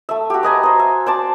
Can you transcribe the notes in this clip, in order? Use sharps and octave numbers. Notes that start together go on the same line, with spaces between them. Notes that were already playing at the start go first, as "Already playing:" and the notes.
A3 E5
F#4 G4
B4 D#5 G#5 A#5
C5 D#5
E5
C5 D5 A5